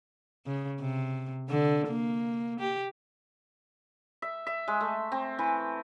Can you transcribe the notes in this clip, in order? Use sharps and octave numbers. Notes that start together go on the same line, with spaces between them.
C#3
C3
D3
A#3
G4
E5
E5
G#3
A3
C4
E3